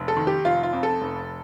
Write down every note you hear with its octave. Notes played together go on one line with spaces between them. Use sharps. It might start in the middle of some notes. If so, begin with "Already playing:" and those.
Already playing: F1
A4
D#3
G4
F1 F4
F4
F2
A4
F1